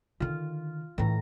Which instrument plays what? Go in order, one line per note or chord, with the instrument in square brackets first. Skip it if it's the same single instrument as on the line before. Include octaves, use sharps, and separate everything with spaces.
[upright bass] D3 D#3 [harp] F4
[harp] A2 A#5 [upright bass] E3 E4